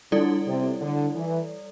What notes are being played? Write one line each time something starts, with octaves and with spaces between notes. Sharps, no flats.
D3 G3 E4 A4 D5
C3
D3
E3